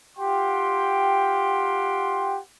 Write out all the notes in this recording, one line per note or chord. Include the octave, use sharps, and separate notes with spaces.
F4 G4 F#5 G5 C6